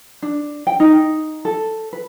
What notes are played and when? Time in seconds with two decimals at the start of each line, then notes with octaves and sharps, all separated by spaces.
0.22 D4
0.67 G5
0.80 D#4
1.45 A4
1.93 B4